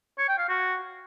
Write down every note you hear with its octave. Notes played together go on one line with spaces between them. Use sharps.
C#5
G5
F5
F#4